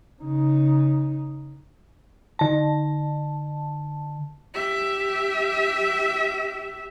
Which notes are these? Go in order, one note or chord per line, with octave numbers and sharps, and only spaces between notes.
C#3 D#4
D3 A5
G4 E5